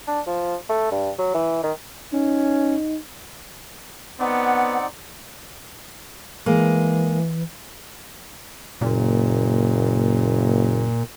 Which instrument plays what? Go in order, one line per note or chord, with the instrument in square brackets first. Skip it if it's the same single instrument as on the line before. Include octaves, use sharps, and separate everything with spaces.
[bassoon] D4
F3
A3
G2
F#3
E3
D#3
[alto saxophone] C#4 [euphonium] D#4
[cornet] B3 [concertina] C4 D#4 D5 [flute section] F#5
[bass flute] E3 [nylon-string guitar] G#3 A#3
[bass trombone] F#1 [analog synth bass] A#2